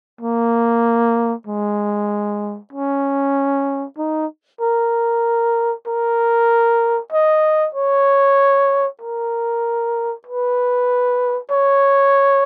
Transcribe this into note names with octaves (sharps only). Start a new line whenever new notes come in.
A#3
G#3
C#4
D#4
A#4
A#4
D#5
C#5
A#4
B4
C#5